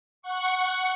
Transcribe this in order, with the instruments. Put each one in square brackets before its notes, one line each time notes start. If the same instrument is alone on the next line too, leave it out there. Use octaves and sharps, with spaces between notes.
[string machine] F#5 C#6